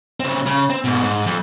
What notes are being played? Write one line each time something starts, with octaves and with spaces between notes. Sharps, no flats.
C#3 C4
C#3
C4
G#2 B2
G#2
F2